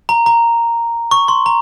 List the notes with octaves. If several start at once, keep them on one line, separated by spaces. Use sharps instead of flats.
A#5
A#5
C#6
C6
A#5